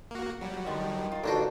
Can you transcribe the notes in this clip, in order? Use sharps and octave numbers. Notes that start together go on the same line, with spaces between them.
A#3 F#4
F#3 G3 F#4
D3 D#3 F3
D#4 F4
A1 D3 A#3 D4 D#4 F4 F#4